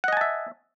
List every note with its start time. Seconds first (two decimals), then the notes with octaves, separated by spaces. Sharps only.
0.04 F#5
0.08 D#5
0.13 G#5
0.17 A5
0.21 E5